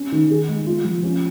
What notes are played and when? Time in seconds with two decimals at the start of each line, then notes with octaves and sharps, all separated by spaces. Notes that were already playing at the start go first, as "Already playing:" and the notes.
Already playing: C#4
0.12 D#3
0.30 G#4
0.48 G#3
0.66 F4
0.85 F3
1.03 C#4